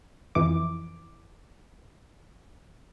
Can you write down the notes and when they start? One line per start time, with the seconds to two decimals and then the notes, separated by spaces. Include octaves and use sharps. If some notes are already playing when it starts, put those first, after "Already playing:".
0.35 F2 E3 D6